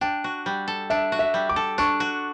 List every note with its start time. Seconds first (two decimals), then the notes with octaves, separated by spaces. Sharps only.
0.01 D4 G5
0.24 F#4
0.46 G3
0.68 A4
0.90 D4 E5
1.12 F#4
1.19 E5
1.34 G3
1.49 D6
1.56 A4
1.78 D4 C#6
2.00 F#4